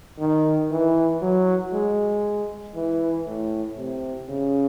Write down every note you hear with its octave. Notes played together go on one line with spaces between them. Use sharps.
D#3
E3
F#3
G#3
E3
A2
C3
C#3